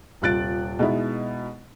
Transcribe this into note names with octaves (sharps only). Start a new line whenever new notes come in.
D#1 C3 F4 F#6 A6 D7
B2 G#3 B3 D#4 E4